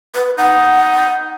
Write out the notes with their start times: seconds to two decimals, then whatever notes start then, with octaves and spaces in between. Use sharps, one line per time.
0.15 B4
0.38 D#4 F#5